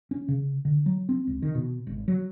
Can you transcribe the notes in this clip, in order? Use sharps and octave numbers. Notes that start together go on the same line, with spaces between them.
C#4
C#3
D3
F#3
C4
C#2
D#3
B2
G#1
F#3